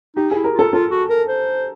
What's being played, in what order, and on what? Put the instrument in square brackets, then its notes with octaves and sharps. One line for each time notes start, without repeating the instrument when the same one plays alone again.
[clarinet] D#4 [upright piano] G4
[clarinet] E4 [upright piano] G#4
[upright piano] A#4
[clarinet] F4 [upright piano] A4
[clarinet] F4 [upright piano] A4
[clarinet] F#4
A#4
C5